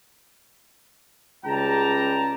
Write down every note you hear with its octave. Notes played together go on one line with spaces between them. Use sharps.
C#2 C#3 G3 G5 A5 A#5